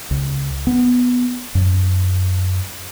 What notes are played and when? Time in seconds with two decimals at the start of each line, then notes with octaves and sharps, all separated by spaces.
0.11 C#2
0.67 B3
1.55 F#2